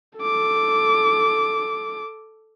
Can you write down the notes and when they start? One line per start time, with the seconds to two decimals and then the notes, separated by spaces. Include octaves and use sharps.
0.19 A4 D6